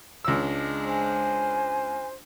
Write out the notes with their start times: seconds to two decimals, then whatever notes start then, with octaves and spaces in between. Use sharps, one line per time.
0.24 C#2 G#3 D4 E6
0.87 C5 G#5